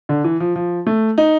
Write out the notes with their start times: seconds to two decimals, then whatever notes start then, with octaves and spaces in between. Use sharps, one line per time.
0.09 D3
0.24 E3
0.40 F3
0.56 F3
0.87 A3
1.18 D#4